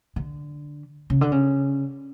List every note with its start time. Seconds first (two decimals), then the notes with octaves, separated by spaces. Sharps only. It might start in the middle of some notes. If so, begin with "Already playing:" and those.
0.16 D3
1.10 C#3
1.21 D3
1.32 C#3